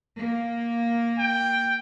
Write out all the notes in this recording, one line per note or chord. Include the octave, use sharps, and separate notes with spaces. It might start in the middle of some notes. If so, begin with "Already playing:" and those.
A#3
G5